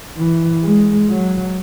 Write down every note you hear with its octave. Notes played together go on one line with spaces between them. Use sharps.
E3
G#3
F#3